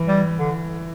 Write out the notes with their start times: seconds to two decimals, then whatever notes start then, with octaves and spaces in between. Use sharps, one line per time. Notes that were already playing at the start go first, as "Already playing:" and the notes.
Already playing: E3
0.08 G3
0.39 D3